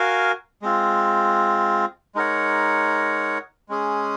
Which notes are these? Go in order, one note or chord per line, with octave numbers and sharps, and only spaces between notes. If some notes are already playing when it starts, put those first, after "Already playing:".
Already playing: F#4 A#4 F5 G#5
G#3 C4 F4
G#3 D#4 A#4 C#5 F#5
G#3 C#4 G#4